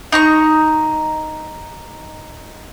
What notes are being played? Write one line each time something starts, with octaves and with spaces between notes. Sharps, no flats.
D#4 A#5 C#6